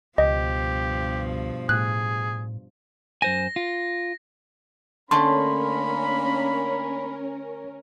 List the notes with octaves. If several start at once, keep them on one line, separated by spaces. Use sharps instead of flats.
C#2 G2 B2 F3 G4 D#5
A2 G#4 F#6
F#2 C5 G#5 A#6
F4
D3 A3 A#3 C#4 D4 A#4 B5 C6